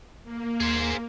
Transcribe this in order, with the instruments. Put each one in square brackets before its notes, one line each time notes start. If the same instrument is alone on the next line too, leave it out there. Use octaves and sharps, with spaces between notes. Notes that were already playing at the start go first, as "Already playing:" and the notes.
[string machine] A#3
[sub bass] D#2 [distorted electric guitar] G#4 C5